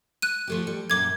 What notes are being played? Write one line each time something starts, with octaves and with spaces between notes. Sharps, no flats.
F#6 D#7
F3 A3 G4
G3
F#2 A#2 D6 G#6